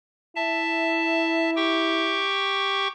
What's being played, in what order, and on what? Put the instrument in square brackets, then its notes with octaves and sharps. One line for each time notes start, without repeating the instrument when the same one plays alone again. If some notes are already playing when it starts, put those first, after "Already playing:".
[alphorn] E4 [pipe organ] E5 A5
[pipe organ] G4 G5 C#6